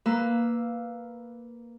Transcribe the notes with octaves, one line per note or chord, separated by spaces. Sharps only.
A#3 B4 F5 E6